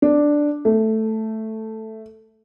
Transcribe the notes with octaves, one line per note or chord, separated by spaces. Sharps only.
D4
A3